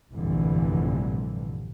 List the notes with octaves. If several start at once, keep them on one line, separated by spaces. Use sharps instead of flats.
F1 A#1 G2 D3 E3